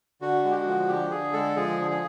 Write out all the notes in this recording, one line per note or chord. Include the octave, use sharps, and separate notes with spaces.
D3 F#4
G#3
G4
F#4
F3
D3 G4
D3 G#4
G#3 A4
F3 G#4
D3
G#4